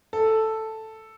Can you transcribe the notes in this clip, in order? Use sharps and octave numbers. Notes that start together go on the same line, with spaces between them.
A4